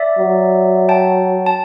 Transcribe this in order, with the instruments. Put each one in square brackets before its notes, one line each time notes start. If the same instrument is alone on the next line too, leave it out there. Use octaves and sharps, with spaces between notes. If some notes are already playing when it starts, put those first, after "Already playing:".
Already playing: [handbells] D5 E5
[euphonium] F#3
[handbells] G5 A5
A5